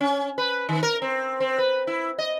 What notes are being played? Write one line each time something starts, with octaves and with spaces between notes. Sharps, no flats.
C#4
B4
D#3
A#4
C4
C4
B4
E4
D#5